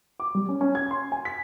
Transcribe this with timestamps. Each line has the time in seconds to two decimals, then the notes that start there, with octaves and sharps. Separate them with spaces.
0.20 D6
0.35 G3
0.49 C#4
0.61 C#4
0.75 G#6
0.91 C6
1.12 G#5
1.25 B6